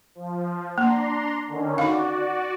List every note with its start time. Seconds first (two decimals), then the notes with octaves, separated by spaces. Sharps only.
0.15 F3
0.78 A#3 D4 A#5 C6
1.47 D3 D#3 C#4
1.78 D#4 F#4 D5 F5